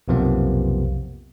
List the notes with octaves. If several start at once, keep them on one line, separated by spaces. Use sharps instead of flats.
B1 F2 C3 F3 A#3 B3